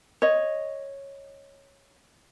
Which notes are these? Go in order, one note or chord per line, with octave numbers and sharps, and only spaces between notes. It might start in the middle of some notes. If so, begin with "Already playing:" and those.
C#5 D#5